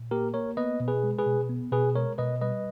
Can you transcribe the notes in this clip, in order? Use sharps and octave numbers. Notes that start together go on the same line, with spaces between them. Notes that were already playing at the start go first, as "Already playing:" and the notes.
Already playing: A#2
A#3 G4 A#4
A#3 A#4 C#5
B3 B4 D#5
B2
G#4 B4
G#3
G#4 B4
B2
B3
B2 G#4 B4
G#3 A#4 C#5
B2 B4 D#5
G3 B4 D#5